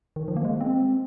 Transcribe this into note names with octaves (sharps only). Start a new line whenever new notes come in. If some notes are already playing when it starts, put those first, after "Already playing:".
D#3
F3
A#3
G#3
C4